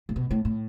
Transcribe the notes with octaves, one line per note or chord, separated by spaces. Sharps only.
A2
B2
A2
A2